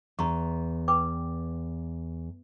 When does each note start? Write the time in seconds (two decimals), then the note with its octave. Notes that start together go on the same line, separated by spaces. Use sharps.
0.19 E2 A#5 C6 C#6
0.88 B4 G5 D6